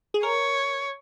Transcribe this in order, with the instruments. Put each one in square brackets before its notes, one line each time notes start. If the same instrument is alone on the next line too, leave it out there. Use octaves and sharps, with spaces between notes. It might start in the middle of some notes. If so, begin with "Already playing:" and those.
[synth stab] G#4
[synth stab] A#4 [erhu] C#5